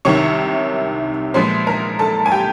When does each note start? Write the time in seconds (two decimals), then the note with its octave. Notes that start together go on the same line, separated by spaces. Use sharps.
0.05 C2 C3 D#3 C#5 C#6
1.34 A#2 F3 G#3 B3 C5 C6
1.67 A#4 A#5
1.99 A4 A5
2.26 G#5
2.32 G4 G5